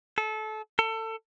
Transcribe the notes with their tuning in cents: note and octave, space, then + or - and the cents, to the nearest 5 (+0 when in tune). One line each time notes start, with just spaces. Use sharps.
A4 -25
A4 +25